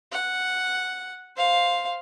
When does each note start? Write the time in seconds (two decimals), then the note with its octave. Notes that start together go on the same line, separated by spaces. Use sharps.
0.12 F#5
1.36 C5 F5